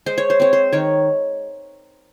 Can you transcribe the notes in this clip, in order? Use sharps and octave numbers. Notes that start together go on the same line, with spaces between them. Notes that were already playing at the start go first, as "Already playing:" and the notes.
G#3 C5
C#5
C5
C4 C#5
C5
D#3 C#5